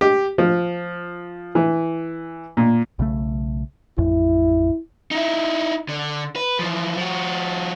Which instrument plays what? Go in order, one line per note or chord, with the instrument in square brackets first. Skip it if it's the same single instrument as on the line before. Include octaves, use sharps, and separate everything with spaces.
[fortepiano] G4
F3
E3
A#2
[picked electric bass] B1 C#3 A3
[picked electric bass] A1 F2 [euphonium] E4
[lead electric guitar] D#4 E4
D3
B4
E3 F3
F3 F#4